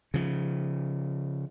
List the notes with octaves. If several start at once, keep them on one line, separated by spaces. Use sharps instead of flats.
C#3 F3